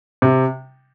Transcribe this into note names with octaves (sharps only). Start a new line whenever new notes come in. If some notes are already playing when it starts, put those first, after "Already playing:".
C3